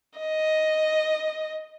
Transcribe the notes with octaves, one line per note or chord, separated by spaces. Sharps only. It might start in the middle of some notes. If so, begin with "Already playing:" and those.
D#5